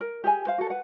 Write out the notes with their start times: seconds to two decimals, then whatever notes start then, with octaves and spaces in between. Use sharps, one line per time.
0.01 A#4
0.24 G4 G#4 G#5
0.45 B4 C5 F5
0.58 F#4 A4
0.70 B4 F#5